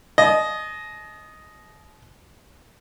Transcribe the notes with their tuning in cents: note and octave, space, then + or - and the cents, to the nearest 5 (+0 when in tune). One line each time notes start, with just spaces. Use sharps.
D#5 +0 A5 -45